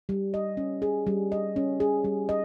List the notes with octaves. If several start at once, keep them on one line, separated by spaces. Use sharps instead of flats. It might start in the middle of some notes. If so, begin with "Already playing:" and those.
G3
D#5
C#4
G#4
G3
D#5
C#4
G#4
G3
D#5